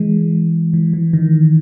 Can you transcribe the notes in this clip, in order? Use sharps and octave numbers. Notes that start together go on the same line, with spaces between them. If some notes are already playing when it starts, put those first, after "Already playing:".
Already playing: E3 G#3
E3
E3
D#3